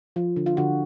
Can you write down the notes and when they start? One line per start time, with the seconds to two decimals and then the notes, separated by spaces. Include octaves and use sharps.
0.16 F3 F4
0.36 D3
0.46 F4
0.57 D3 F#4